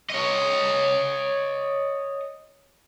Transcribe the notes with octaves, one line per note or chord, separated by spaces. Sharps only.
C#5 D#5